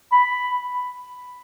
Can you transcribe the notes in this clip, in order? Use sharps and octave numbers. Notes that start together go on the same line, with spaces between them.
B5